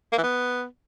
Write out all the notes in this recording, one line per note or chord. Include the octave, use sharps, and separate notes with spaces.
A#3
E3
B3